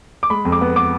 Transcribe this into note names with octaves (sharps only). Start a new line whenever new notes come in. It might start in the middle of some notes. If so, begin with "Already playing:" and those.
D6
G#3 B5
F2
D6
B3
B3 D6